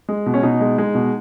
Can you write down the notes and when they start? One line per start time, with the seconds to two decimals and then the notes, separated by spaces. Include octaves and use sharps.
0.09 G#3
0.26 B2
0.34 C#4
0.43 B2 D#4
0.61 G#3
0.78 G#3
0.95 B2